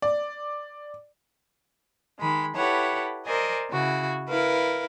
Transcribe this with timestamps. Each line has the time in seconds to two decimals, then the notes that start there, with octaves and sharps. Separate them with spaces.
0.02 D5
2.19 D#3 G#3 B5
2.56 E4 G4 A4 B4 C#5 F#5
3.26 A#4 C5 D5 D#5 G#5
3.70 C#3 E4 F#4
4.28 E4 A#4 B4 F5